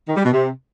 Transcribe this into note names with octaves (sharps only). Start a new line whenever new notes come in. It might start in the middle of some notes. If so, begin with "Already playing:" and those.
D#3
G3
B2
C3